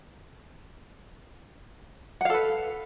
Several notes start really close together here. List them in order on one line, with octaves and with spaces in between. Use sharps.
F#5 F5 A4 B4